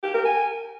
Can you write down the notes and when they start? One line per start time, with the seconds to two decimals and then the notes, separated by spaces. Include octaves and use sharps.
0.03 G4
0.14 A#4
0.25 G#5